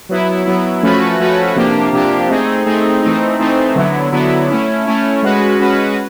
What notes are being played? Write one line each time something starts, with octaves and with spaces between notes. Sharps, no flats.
F#3 B3 E4
F#3 B3 E4
F3 A3 C#4 F#4 B4
F3 A3 C#4 F#4 B4
C3 F3 A#3 D4 G4
C3 F3 A#3 D4 G4
A3 C4 D#4 G#4
A3 C4 D#4 G#4
E3 A3 C4 D#4
E3 A3 C4 D#4
D3 F#3 B3 E4
D3 F#3 B3 E4
A3 C#4 E4
A3 C#4 E4
G#3 C#4 F#4 B4
G#3 C#4 F#4 B4